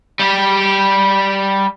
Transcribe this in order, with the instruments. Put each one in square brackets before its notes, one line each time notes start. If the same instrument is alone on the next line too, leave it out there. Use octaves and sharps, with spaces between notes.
[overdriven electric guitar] G3 G4